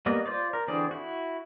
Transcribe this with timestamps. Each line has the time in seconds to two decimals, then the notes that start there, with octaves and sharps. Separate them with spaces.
0.06 G3 A#3 B3 D#5
0.26 F4 C5 D5
0.53 A#4
0.68 D3 E3 C4 G#4 D5
0.91 E4 F#4